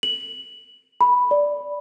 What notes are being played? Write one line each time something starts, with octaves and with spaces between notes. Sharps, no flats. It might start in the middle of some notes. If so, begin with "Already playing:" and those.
F#7
B5
D5